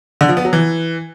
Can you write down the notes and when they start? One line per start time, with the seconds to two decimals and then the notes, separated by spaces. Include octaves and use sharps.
0.21 D3
0.29 F3
0.37 B3
0.45 F#3
0.53 E3